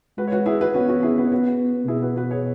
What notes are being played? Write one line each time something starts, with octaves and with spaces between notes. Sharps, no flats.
G#3 F#4 B4
C#5
F#4 B4
E4 G#4
F#4 B4
B3 C#4 F#4
C#4 F#4
E4 G#4
F#4 B4
C#5
F#4 B4
B2 E4 G#4
F#4 B4
F#4 B4
G#4 C#5